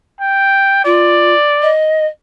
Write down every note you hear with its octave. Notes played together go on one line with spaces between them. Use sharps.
G5
F4 D5
D#5